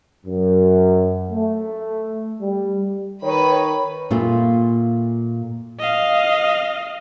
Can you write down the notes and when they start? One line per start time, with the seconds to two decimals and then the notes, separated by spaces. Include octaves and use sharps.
0.26 F#2
1.30 A3
2.40 G3
3.23 D#3 B4 C#5 B5
4.11 A#2 A3 F4
5.79 D#5 F5